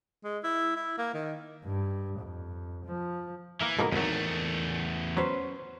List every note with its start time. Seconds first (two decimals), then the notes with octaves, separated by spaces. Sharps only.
0.24 G#3
0.44 E4
0.76 E4
0.98 A#3
1.14 D#3
1.66 G2
2.20 F2
2.85 F3
3.61 E3 A#3 A#4 E5
3.79 G#2 B2 A#3 A4 A#4
3.92 G#1 E2 F#3 A3 D#4 A#4
5.17 F#3 C#4 B4 C5